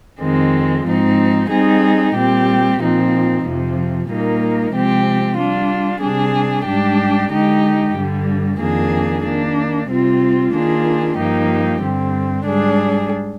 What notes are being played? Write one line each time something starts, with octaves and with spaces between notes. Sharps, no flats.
F2 D#3 G#3 C4
G#2 F3 C4 D#4
G3 C4 D#4 G#4
A#2 G3 C4 G4
A#2 F3 C4 D#4
F2 C3 F3
A#2 G3 A#3 D#4 A#4
C3 F3 G#3 C4 G4
G3 D4 F4
C3 G3 D4 G#4
G#2 G3 D4 G4
D3 G#3 D#4 G4
G2 D3 G3
F2 D#3 A#3 D4 G#4
D#3 A#3 D4
C3 G3 C4 F4
D#3 A#3 D4 F4 G#4
G2 F3 A#3 D#4 G4
G2 D3 G3 C4
G#2 G3 D4 G#4